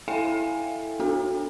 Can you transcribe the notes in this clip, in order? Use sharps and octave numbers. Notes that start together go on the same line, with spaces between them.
E4 A4 E5 F5 G5 G#5
B3 D4 F#4 A4